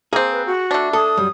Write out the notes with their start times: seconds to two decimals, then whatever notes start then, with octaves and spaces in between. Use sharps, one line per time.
0.13 A#3 C4 G#4
0.31 B4
0.46 F#4
0.71 A3 D4
0.93 A4 D#6
1.17 F#2 G3